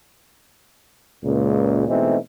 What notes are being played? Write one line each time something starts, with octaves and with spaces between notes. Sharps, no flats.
C#2 A#2
B2 E3 G#3 A3 C4 D#4